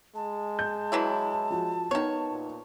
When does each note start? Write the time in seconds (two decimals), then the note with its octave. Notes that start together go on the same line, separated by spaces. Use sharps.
0.16 G#3 A5
0.59 G6
0.92 E3 F#3 E4
1.50 F3 F#4
1.91 D#3 B3 D#4 C#5
2.31 A#2